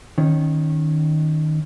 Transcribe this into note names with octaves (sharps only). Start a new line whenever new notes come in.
D#3 C#4 C#5